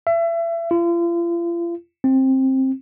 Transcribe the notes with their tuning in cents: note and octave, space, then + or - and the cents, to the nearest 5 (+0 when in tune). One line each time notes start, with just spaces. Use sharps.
E5 +30
F4 -40
C4 +15